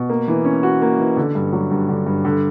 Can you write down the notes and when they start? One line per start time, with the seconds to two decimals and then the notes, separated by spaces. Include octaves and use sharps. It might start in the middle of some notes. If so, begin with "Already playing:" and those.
Already playing: B2
0.09 A#3
0.28 E3
0.45 C#4
0.63 F#4
0.82 A#3
0.99 E3
1.17 D3
1.35 G2
1.52 F#3
1.71 G2
1.89 D3
2.06 G2
2.25 D3